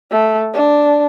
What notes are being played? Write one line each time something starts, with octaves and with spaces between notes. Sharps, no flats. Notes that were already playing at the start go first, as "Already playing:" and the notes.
A3
D4